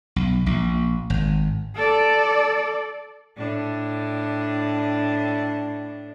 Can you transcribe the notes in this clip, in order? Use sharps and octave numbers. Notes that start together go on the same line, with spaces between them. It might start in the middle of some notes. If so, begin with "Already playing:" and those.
B1
A#1
G#1
A4 D5
A2 D4